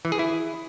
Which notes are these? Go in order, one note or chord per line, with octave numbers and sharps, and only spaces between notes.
E3
G#4
E4